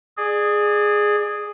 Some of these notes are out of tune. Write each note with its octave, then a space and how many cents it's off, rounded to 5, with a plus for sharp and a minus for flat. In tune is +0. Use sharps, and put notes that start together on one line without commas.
G#4 +0 D5 +30